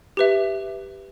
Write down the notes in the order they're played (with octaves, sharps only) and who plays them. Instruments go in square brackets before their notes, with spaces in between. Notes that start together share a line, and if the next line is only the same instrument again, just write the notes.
[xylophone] G4 B4 E5